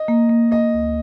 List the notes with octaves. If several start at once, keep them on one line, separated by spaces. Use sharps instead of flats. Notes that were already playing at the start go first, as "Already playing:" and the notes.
Already playing: D#5
A#3
A#3
A#3 D#5
D2